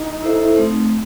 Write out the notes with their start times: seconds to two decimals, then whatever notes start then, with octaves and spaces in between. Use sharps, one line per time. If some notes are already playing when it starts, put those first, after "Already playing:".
Already playing: D#4
0.22 E4 A4 C5 E5
0.57 A3 C4 D#4